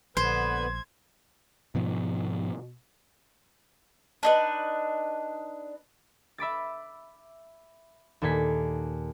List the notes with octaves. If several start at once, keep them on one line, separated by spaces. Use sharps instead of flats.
A#1 D3 B3 B4 C5 G#6
G#2 B2 F3
D4 D#4 B4
E5 B5 D6 A6
D#2 A#2 A4 G#5 B6